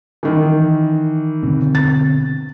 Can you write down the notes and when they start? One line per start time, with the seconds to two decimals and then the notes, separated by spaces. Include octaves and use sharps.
0.23 D#3 E3
1.43 B2 D3 C4
1.75 A6